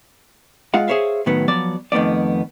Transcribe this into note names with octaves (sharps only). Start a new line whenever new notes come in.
G#3 F4 F5 F#5
G#4 C5 C#5 E5 F5
A2 D#3 F#3 B3
F3 F#3 B3 D5
F2 D#3 A3 B3 D5